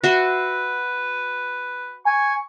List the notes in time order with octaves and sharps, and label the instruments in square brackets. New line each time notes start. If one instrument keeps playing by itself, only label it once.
[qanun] F#4 E5 C6 [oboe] B4
[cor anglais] G#5 [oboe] C#6